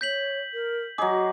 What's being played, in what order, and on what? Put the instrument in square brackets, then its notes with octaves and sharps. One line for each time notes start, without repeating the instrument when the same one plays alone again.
[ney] C#5 [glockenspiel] G6 B6 F#7
[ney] A#4
[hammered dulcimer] F#3 G#4 [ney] D#5 [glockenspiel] D6